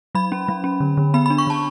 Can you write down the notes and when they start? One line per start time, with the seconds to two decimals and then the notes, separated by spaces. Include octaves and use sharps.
0.15 F#3 B5
0.32 C#4
0.48 F#3
0.64 C#4
0.80 D3
0.97 D3
1.14 B3 B5
1.26 D4 B5
1.38 C#6
1.47 D3 A5